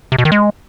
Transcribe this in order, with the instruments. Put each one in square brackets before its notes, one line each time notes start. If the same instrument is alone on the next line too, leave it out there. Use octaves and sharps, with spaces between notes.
[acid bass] C3
B2
D#3
G#3